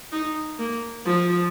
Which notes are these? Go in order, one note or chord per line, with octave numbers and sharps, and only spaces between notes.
D#4
A#3
F3